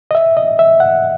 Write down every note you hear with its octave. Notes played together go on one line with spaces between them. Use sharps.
D#5
E5
D#5
E5
F#5